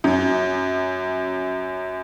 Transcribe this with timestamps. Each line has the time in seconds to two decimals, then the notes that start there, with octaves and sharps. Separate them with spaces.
0.04 F#2